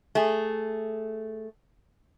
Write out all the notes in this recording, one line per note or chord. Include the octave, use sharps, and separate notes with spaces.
A3 G#4